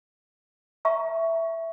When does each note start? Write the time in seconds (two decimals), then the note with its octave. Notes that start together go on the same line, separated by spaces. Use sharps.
0.85 E5 A#5 C#6